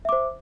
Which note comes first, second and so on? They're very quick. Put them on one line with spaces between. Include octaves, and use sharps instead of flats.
E5 D6 C5